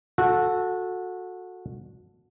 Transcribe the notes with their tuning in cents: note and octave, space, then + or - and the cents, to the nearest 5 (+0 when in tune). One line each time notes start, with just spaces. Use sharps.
F#4 -20 A4 +0